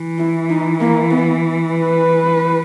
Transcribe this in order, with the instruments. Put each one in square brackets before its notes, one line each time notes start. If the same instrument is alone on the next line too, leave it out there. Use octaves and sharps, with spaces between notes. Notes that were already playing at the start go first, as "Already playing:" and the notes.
Already playing: [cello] E3
[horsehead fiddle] E4
D#4
A#3
B3
B4